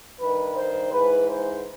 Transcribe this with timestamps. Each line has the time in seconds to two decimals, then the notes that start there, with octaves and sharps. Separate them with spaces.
0.19 G2 D#3 B4
0.56 C5
0.92 G#2 E3 B4
1.29 C5